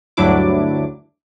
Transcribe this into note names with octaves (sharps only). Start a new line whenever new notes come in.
D2 G2 F#3 D4 E4 D6